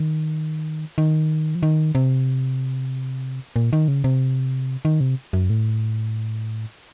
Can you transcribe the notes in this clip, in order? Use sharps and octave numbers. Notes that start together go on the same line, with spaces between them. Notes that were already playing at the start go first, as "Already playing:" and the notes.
Already playing: D#3
D#3
F3
D#3
C3
A#2
D#3
C#3
C3
D#3
C3
F#2
A2